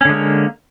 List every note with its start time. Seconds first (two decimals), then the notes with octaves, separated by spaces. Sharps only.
0.01 C#4
0.05 D3
0.09 G#3
0.13 A#3